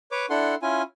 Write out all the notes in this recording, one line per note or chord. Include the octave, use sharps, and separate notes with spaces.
B4 C#5 D6
D4 E4 A4 F#5 C6
C#4 E4 F4 G#5